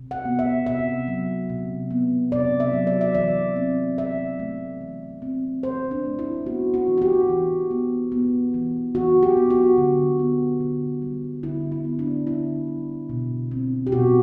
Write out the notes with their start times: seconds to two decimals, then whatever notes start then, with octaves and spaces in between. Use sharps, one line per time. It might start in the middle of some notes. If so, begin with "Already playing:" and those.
Already playing: C3
0.11 F#5
0.25 B3
0.39 E5
0.67 C3 E5
1.08 F#3
1.50 C3
1.91 B3
2.32 C3 D5
2.60 E5
2.73 F#3
2.87 D5
3.01 E5
3.15 E3 D5
3.56 C4
3.98 E3 E5
4.39 A3
4.81 E3
5.22 C4
5.63 E3 C5
5.91 D4
6.05 A3
6.19 E4
6.46 B3 F#4
6.74 F#4
6.88 E3
6.98 F#4
7.02 G4
7.29 E3
7.71 B3
8.12 B3
8.54 E3
8.95 E3 F#4
9.23 G4
9.37 B3
9.50 F#4
9.78 D3
10.19 B3
10.60 D3
11.02 G3
11.43 D3 E4
11.72 E4
11.85 B3
11.99 D4
12.26 D3 E4
12.68 G3
13.09 B2
13.51 C4
13.87 G4
13.92 B2 F#4